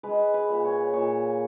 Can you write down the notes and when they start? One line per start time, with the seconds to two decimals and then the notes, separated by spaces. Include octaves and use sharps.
0.03 G#3 B4
0.34 B4
0.49 A#2
0.65 C#5
0.93 A#2 C#5